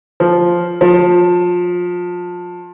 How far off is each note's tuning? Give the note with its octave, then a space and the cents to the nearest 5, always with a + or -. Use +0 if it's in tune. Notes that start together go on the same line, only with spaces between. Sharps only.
F3 +0
F3 +25